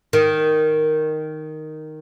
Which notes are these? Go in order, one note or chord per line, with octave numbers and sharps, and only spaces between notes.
D#3